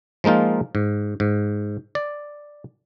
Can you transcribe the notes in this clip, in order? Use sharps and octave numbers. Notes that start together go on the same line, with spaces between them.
F3 G#3 A#3 D#4 F4
G#2
G#2
D5